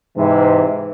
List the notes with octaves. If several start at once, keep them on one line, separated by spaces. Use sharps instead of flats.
G#2 C3 E3